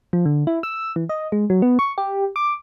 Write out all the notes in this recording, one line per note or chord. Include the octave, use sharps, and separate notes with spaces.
F3
D3
E4
E6
E3
D#5
G#3
F#3
B3
C#6
G4
D6